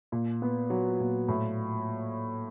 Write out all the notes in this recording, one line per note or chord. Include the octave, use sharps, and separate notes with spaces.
A#2
B3
F#3
A#2
A2